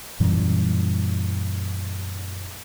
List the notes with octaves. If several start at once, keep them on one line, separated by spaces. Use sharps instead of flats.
F#2 A#2 E3 G3